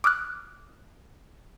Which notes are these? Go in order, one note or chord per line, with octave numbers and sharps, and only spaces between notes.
D6 D#6 F6 F#6